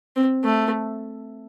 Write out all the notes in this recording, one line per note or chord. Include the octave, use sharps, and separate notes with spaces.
C4
A3